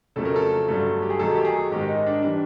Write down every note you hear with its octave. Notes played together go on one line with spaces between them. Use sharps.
F2 C#3 F#3 A3 A4
A#4
A4
G2 D3 F#3 A3
G4
G#4
F#2 D#3 F#3 A3 A4
G4
G#4
G#2 D#3 G#3 G4
D#4
D4
E3 G3 D4